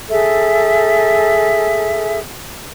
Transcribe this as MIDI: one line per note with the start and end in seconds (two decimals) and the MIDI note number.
0.09 2.17 68
0.09 2.17 69
0.09 2.17 76